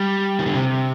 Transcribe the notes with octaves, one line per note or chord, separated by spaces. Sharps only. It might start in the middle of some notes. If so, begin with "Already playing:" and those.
Already playing: G3
D#3
D3
C3